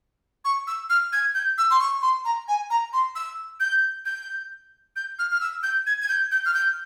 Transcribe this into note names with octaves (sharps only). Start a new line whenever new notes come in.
C#6
E6
F6
G#6
G6
E6
C6
C#6
C6
A#5
G#5
A#5
C6
E6
G6
G6
G6
F6
F6
E6
G6
G#6
G#6
G6
G6
F6
G6